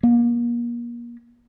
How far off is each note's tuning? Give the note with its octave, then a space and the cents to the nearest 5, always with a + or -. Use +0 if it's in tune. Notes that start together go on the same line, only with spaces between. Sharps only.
A#3 +35